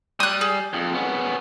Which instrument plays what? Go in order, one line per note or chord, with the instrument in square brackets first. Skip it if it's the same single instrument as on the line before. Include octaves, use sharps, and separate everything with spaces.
[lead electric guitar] G3 [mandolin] D#6 F#6
[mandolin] G#4
[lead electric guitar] F2
B3 C#4